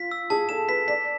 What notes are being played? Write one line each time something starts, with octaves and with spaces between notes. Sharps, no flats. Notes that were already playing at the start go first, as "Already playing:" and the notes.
Already playing: F4 B6
E6
G#4 A5
A4 E7
B4 B6
D5 B6